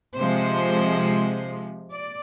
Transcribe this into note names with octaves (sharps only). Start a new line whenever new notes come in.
C3 F3 G#3 C5
D5